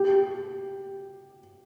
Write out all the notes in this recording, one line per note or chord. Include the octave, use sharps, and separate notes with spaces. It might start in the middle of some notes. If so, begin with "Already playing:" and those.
Already playing: G4